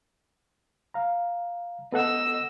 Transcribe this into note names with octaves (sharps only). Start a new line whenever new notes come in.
F5 A#5
B3 A4 D#5 F#5 E6